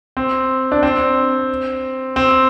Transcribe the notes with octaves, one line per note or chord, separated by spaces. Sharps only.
C4
D4
C4
C4